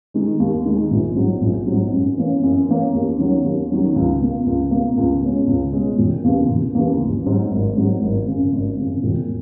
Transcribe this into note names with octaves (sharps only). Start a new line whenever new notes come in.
D#3 G#3
D#2
D#3 G#3
A#1
G#2 F#3
A#1
G#2 F#3
F#2
E3 A#3 C#4
F#2
E3 A#3 C#4
D#2
D#3 F#3 C#4
D#2
D#3 F#3 C#4
C#2
B2 A#3
C#2
B2 A#3
C#2
B2 G#3 C#4
C#2
B2 G#3 C#4
E1
D#2 C#3 E3 A#3
E1
D#2 C#3 E3 A#3
G#1
G#2 F#3
G#1
G#2 F#3
G#1
C#3
F#2
G#1
F#2 C#3
E1